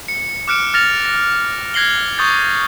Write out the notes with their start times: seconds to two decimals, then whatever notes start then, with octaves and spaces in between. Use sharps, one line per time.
0.08 C#7
0.48 D6 F6 F#6 C#7 D7 E7
0.74 F6 A6 A#6 F7
1.05 A#6
1.74 F#6 G#6 A#6 C7 F#7 G7
2.18 C#6 D#6 G6 A6